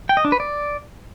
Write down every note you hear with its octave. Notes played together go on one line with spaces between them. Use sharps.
G5
D#5
D4
B4
D5